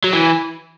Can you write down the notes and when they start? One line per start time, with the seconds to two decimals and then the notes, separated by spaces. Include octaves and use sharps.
0.04 F#3
0.13 E3